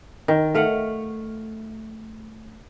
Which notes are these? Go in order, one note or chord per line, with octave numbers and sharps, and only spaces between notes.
D#3
A3 F5 F#5